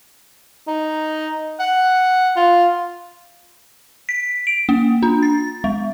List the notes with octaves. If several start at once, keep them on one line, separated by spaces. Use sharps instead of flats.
D#4
F#5
F4
B6
D7
A#3
D4
A6
G#3